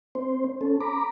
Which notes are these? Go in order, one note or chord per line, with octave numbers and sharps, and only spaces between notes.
C4 C5
C#4 A4
A#5 B5 D6